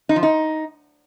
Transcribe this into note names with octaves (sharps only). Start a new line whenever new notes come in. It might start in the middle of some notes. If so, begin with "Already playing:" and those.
D#4
F3
D#4